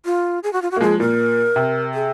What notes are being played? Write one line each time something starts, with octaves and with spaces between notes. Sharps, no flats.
F4
G#4
F#4
F4
F#4
A#3
F3 G#3 G#4
A#2 A#4
C3
G#4